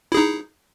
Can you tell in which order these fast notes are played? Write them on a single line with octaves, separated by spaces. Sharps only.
E4 G#4 D#4